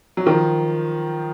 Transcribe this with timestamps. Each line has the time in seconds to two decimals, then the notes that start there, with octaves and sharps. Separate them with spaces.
0.17 F#3
0.26 D#3 F3